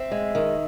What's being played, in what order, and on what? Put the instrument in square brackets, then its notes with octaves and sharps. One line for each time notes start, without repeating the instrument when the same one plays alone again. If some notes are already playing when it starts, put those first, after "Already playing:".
Already playing: [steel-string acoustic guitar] C4 [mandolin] E5
[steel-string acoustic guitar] G#3
D#3